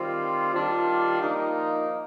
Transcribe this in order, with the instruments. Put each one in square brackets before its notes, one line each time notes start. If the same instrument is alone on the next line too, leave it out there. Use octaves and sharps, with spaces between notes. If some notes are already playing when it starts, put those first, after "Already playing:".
Already playing: [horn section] D#3 G3 C4 F4
D#3 G3 D4 F4
F3 A#3 D#4